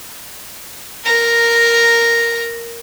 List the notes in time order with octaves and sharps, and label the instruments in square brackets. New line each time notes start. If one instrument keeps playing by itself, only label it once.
[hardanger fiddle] A#4 A#5